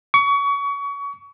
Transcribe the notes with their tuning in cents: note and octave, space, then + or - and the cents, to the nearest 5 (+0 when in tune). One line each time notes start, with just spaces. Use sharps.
C#6 +30